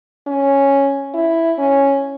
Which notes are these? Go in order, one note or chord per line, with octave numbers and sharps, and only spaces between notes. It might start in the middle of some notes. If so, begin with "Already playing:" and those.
C#4
E4
C#4